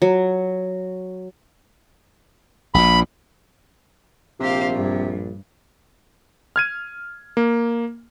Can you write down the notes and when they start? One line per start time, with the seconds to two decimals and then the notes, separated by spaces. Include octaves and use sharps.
0.02 F#3
2.74 A#1 A#2 B5
4.40 A#1 C3 G4 C5 F5
4.70 G2
6.56 F6 G#6 D#7
7.37 A#3